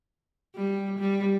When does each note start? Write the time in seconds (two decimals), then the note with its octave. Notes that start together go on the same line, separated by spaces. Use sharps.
0.56 G3
0.99 G3